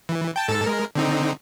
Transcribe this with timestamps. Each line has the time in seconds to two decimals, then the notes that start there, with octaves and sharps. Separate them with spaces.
0.09 E3
0.36 G5 A5
0.48 G#2 A4 A5
0.66 G#3 A#4
0.95 D3 C4 D#4